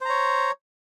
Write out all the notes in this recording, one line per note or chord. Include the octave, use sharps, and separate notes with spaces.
C5 C#5 A#5